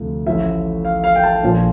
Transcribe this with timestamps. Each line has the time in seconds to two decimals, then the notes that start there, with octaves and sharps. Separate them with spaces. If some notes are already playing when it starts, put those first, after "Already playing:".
Already playing: D2 C3 F3
0.26 A1 A2 F3 E5
0.85 F5
1.04 F5
1.16 G5
1.23 A5
1.42 A#1 A#2 F3